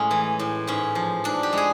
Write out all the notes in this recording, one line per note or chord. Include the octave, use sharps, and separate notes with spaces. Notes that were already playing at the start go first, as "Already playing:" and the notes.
Already playing: A2 G#3 C#4
E3
A2
G#2 C#4
F3
G#2 D4
G4
G#3 G#4